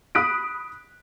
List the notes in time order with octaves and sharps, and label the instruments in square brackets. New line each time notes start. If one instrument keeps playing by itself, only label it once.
[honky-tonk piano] B5 D#6 F#6 B6 D7